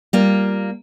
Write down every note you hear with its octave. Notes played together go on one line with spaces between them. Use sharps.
G3 A#3 F4